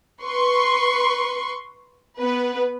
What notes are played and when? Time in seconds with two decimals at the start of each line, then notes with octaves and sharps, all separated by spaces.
0.22 B4 C6 C#6
2.19 B3 B4